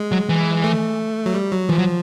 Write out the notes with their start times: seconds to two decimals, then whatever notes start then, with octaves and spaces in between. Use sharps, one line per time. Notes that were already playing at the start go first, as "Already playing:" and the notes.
Already playing: G#3
0.12 F#3
0.29 E3
0.64 A3
1.26 F#3
1.34 G3
1.51 F#3
1.69 E3 F3
1.78 F#3